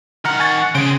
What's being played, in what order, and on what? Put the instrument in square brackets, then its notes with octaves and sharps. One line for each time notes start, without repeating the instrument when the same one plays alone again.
[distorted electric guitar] D#3 F#5 [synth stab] A#5 F6
[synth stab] G#5 C#6 A6
[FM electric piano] C#3 [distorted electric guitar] C4 G#4 [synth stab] D7